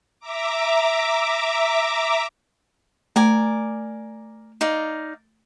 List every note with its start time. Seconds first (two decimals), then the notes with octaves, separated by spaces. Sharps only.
0.20 E5 A#5 D6
3.16 A3 A#4 D5 G#5
4.61 D#4 D5 F5